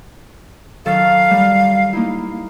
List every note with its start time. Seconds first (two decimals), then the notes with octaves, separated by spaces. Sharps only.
0.86 D#3 F#3 A4 F5
1.31 G3
1.93 A#3 D#4 E4